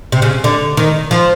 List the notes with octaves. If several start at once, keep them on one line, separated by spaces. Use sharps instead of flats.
C3
C#3
D3
D#3
F3